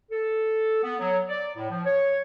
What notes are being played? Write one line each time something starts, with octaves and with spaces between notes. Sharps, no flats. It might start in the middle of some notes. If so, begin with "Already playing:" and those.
A4
B3
F#3
D5
A2
F3
C#5